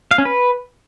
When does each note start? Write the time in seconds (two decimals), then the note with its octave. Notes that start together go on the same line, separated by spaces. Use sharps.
0.11 F5
0.18 C#4
0.25 B4